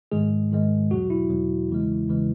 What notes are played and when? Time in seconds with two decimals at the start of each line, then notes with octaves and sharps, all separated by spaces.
0.12 G#2 D#3 G#3 G#4
0.51 G#2 D#3 G#3
0.90 E2 B2 F#3 F#4
1.10 E4
1.30 E2 B2 F#3
1.69 E2 C#3 E3 G#3
2.08 E2 C#3 E3 G#3